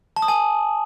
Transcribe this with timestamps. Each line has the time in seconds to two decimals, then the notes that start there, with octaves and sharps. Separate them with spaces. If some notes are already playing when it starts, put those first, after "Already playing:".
0.16 A5
0.22 D#6
0.28 G#5